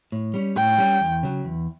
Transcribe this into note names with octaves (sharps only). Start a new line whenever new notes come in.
A2
G3 C#4
A2 G5
G3 C#4
E2
C#3 F#3
E2